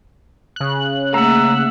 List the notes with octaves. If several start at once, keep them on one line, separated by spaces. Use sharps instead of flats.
C#3 F#6
A3 A#3 E5 F#5 A#5